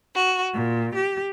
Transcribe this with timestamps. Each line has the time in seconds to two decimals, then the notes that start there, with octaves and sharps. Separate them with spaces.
0.14 F#4
0.54 A#2
0.95 G4